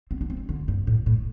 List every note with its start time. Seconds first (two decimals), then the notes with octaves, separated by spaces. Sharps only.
0.11 C4
0.21 D4
0.30 C4
0.49 D3
0.68 G2
0.87 A2
1.06 A2